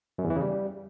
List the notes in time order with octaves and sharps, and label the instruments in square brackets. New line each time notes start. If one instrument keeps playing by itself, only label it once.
[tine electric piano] F#2
E2
E3
C#3
G3